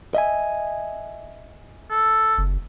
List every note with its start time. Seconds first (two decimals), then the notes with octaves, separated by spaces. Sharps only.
0.15 D#5 E5 G#5
1.91 A4
2.38 F#1